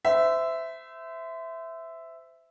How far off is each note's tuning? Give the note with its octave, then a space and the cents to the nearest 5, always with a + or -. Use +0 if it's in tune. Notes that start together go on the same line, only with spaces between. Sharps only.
C5 -30 E5 +0